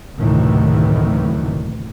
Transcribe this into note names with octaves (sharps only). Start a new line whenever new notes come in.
F#1 D2 A2 C3 D#3 E3